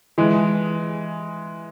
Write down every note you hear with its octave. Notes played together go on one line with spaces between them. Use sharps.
E3 G#3